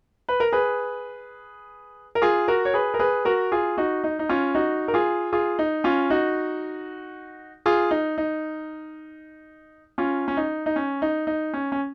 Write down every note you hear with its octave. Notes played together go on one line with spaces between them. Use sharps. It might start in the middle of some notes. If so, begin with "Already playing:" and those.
B4
A#4
G#4 B4
A#4
F4 G#4
F#4 A#4
C#5
G#4 B4
A#4
G#4 B4
F#4 A#4
F4 G#4
D#4 F#4
D#4
D#4
C#4 F4
D#4 F#4
A#4
F4 G#4
F4 G#4
D#4
C#4 F4
D#4 F#4
F4 G#4
D#4
D#4
C#4 F4
C#4
D#4
D#4
C#4
D#4
D#4
C#4
C#4